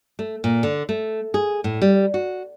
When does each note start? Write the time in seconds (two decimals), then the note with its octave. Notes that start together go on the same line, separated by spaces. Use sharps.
0.19 A3
0.44 A#2
0.63 D3
0.89 A3
1.34 G#4
1.64 A2
1.82 G3
2.14 F#4